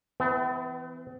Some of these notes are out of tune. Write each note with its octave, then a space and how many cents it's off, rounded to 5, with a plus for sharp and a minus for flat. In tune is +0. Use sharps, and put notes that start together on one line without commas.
E3 +0 B3 +45